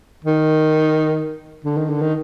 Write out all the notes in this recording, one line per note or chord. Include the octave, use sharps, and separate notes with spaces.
D#3
D3
D#3
D3
D#3